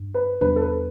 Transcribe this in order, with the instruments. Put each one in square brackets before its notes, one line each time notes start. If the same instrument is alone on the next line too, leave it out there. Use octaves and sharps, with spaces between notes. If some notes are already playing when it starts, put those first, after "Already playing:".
Already playing: [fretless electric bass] G2
[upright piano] B4
[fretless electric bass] E2 C3 G3 D4 [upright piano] B4
[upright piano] A4
B4